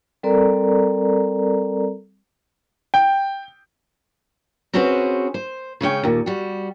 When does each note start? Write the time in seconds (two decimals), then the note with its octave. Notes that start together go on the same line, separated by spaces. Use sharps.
0.23 G3 C4 A4 A#4 D5 A#5
2.94 G5
4.73 C4 C#4 F#4 G#4 B4 C5
5.34 C5
5.81 C#3 G#3 C#4 G5
6.03 D#2 A#2
6.26 G3 F#4